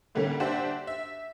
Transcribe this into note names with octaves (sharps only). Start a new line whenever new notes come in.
A2 D3 G3 A#3 C#4
D4 F#4 G4 C5 E5
E5